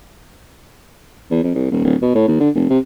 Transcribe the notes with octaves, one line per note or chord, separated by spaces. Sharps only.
E2
F2
C2
D#1
D1
B2
A2
D#2
D3
F1
C3